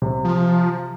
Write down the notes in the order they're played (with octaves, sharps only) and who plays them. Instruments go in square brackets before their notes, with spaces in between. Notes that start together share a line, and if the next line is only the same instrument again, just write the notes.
[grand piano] C3
[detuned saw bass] F3